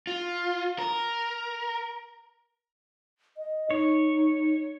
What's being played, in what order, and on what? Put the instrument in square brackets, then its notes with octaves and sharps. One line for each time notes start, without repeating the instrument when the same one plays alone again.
[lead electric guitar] F4
A#4
[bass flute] D#5
[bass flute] D#4 [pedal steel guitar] C#5